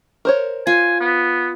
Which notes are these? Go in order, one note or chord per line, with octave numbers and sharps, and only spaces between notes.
A#4 C5 C#5
F4 G#5
B3